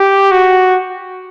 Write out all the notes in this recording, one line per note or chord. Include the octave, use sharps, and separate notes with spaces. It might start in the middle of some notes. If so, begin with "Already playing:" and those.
Already playing: G4
F#4